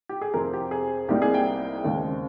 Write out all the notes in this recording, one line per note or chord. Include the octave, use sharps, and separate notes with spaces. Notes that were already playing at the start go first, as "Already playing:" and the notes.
G4
G#4
F2 C3 F3 C4 A#4
G4
G#4
C2 C3 G3 A#3 D#4 G4
G#4
G5
D#2 C#3 G#3 C4